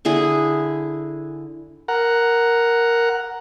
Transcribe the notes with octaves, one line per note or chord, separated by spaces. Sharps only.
D3 E4 G#4
A#4 F#5